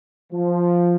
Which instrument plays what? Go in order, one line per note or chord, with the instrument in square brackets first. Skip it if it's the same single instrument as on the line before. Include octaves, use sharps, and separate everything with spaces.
[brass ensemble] F3